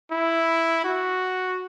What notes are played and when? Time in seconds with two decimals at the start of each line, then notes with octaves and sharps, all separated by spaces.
0.11 E4
0.84 F#4